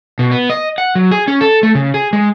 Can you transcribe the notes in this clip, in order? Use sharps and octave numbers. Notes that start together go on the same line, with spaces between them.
B2
B3
D#5
F#5
F#3
G#4
C#4
A4
A3
C#3
G#4
G#3